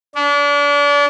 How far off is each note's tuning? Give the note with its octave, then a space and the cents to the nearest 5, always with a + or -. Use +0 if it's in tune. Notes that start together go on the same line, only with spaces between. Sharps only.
D4 -35